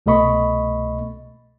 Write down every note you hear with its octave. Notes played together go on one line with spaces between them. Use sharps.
C2 B2 A3 D#5 B5 C#6